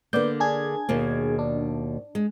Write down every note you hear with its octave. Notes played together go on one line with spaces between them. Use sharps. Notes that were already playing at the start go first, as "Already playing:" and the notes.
D3 A#3 B3 D5 G6
D4 G#4 G#6
D#2 B2 A#3
D4
G#3